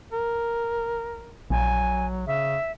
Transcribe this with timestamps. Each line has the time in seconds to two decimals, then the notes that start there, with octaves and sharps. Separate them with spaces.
0.13 A#4
1.50 A#1 F#3 G#5
2.27 C#3 E5